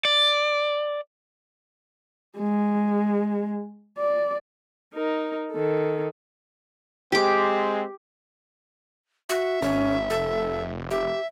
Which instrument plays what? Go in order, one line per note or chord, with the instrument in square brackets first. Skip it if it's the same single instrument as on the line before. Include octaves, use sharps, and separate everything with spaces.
[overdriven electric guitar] D5
[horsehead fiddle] G#3
D5
[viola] D#4 A#4
D#3 A4
[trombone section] G#3 C4 [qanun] G4 D6
[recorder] F#4 [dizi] E5
[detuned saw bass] G#1 [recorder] C#4
[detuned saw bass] F1 [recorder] A4
[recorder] G4 [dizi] E5